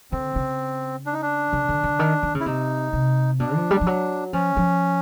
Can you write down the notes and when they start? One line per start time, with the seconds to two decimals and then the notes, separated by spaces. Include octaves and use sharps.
0.12 D3 C4
0.36 C#3
1.06 D4
1.13 D#4
1.22 D4
1.53 C#3
1.69 D3
1.84 D3
1.99 D#3
2.23 D#3
2.35 C#3
2.41 E4
2.46 C3 D#4
2.93 C3
3.40 B2 D4
3.55 F3
3.71 G3
3.81 F3
3.87 F#3
4.33 F3 C#4
4.57 F3